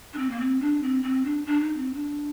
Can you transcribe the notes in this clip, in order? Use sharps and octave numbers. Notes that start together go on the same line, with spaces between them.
D4
C4
A#3
C4
D4
C4
C4
D4
D4
D#4
C4
D4